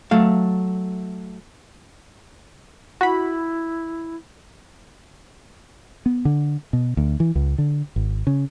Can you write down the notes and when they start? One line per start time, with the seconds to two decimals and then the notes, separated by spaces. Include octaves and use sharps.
0.11 F#3 A3 F5
3.01 E4 F#4 B5
6.06 B3
6.25 D3
6.73 B2
6.97 D2
7.20 E3
7.35 C#2
7.58 D3
7.96 G#1
8.27 C#3